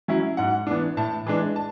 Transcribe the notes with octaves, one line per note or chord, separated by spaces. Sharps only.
F#3 C#4 E4
G#2 F#5
E3 B3 D4
A2 A5
E3 G#3 D4
A5